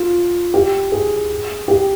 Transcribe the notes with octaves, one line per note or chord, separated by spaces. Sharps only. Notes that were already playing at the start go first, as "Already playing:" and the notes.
Already playing: F4
G4
G#4
G4